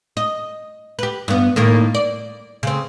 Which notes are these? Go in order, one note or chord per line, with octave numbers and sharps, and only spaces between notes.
D#5
G4 B4
G2 B3
A2 D#3 A#3
D5
C#3 C4